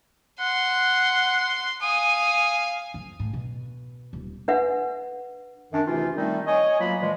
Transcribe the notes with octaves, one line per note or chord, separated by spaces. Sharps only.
F#5 C6
F5 G#5 D#6
F2
A2
B2
D#1
D4 B4 E5 F#5
F#2 D#3 D4
D2 C3 E3 C#4 D#4 F4
D#3 G3 A3 C4 D#4
C#5 D#5 G#5
D2 F#3 A#3 F4 B5
A#2 E3 F3 G#3